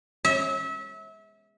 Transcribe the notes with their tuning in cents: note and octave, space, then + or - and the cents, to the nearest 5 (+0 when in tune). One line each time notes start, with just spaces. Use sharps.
E5 -30